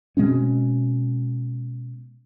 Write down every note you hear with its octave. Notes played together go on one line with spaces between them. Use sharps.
B2 G#3 C4 C#4